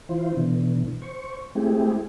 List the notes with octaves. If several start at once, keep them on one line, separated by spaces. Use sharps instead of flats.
E3 E4 F4 C5
B2 D3 E3
C5 C#6
G#3 A3 C4 E4 G4 G#4